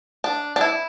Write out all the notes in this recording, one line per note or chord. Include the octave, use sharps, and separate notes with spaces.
D4
D4
E4